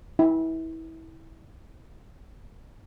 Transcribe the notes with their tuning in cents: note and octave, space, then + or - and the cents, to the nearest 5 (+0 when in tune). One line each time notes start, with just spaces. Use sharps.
E4 -25